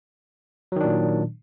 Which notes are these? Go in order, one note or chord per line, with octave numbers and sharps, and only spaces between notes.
A#2 D#3 F#3 D4